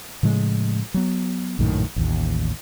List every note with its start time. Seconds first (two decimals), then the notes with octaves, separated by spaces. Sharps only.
0.23 A2 C#3 F3 G#3
0.94 F#3 B3
1.59 A#1 F#2 A2 D#3
1.96 A1 D#2